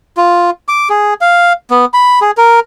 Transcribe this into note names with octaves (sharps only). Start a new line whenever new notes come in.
F4
D6
G#4
F5
B3
B5
G#4
A#4